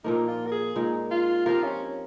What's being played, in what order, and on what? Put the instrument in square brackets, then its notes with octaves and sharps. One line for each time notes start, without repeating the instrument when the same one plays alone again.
[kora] A#2 F3 A#3 [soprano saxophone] D#4
[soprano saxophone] F4
A#4
G#4
[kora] A#2 G#3 D#4
[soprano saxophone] F4
[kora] F3 C4 G4 A#4 [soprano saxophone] F4
[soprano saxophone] C#4